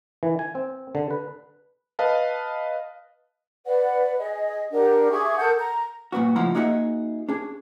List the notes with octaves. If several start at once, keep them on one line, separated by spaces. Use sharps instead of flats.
E3
G#5
C4
D3
B4
B4 D#5 F5 A5
B4 D5 F#5
G#4 D#5
D4 G4 A#4 F#5
G#4 E5 C#6 D6
A4 A#4 F#5 G6
A#5
G2 A#2 B3 F#4
C#2 A2 F3 E4 F#5 A#5
A#3 D#4 F#4 G#4 D#5 E5
D4 G#4